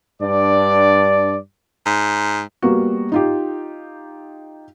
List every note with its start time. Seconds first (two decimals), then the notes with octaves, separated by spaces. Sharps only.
0.20 G2 D4 D5
1.86 G#2
2.62 G3 A#3 B3 F#4
3.12 D#4 F4 G4